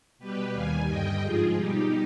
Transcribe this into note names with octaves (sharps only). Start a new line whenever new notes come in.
B2 G3 G4 B4
D#2 D#3 G3 F5 G#5
G2 D3 G3 D#5 G5
G#2 F3 F4 G#4
B2 G3 D#4 G4